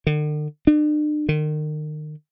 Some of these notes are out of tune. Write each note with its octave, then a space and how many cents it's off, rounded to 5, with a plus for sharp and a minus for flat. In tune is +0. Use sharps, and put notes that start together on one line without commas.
D3 +45
D4 +40
D#3 -35